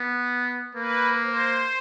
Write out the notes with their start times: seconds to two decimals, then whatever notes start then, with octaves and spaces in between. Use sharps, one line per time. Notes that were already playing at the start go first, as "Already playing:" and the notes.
Already playing: B3
0.75 A#3 B4
1.24 C5